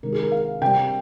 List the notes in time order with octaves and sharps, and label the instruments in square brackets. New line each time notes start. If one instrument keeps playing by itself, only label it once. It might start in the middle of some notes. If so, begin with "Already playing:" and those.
[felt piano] C3 D#3 G#3 A#4
G#4
A#4
F5
C3 G3 G5